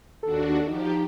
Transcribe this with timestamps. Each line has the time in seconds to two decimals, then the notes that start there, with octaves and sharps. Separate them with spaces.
0.23 D#2 D4 F#4 A4
0.68 F3 D#4 G4